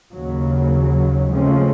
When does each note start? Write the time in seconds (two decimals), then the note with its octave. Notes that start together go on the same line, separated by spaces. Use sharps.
0.13 D#2 C#3 F#3
1.32 C#3 F3 G#3 A3 C4 C#4